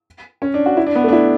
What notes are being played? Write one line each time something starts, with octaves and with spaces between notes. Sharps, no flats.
C#4
D4
F#4
E4
D4
B3
A3
D4
E4